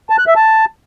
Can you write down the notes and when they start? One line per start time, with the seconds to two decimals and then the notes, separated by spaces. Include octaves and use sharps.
0.10 A5
0.18 F#6
0.27 E5
0.36 A5